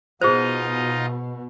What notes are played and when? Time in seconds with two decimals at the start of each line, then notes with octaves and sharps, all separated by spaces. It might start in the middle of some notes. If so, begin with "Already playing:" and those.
0.22 B2 D#4 F4 G#4 C5 D#5